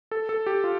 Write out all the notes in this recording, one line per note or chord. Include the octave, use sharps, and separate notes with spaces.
A4
A4
G4
F4